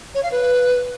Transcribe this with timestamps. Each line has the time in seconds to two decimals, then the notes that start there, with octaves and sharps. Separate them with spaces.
0.15 C#5
0.23 F5
0.32 B4